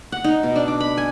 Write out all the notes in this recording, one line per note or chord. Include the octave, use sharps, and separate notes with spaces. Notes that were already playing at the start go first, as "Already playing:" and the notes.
F#5
D#4
B2
D4
D6
B5
G#5